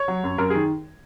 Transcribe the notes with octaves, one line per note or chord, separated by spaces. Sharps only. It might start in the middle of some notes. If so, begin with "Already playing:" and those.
Already playing: C#5
F#3
F#2
F#2 A#4
D#3 G#4